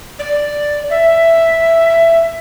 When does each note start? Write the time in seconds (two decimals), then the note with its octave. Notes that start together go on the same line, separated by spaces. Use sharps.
0.19 D5
0.90 E5